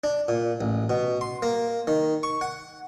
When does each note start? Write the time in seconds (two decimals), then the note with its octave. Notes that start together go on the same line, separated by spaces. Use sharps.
0.04 D4
0.28 A#2
0.61 A1
0.90 B2
1.21 C6
1.42 A#3
1.87 D#3
2.23 C#6
2.41 F#5